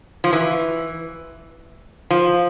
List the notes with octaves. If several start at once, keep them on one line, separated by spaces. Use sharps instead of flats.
F3
E3
F3